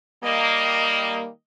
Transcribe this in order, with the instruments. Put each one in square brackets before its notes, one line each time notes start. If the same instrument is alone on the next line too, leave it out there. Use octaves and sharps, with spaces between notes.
[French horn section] D#3 G3 A#3 [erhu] D#5